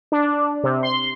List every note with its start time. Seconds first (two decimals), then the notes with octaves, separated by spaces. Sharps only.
0.12 D4
0.64 C3
0.83 C6